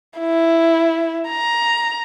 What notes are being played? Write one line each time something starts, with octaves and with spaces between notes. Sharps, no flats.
E4
A#5